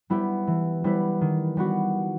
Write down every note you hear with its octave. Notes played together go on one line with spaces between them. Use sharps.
G3 B3 E4 G4
E3
G3 B3 E4 B4
D#3
G3 B3 F#4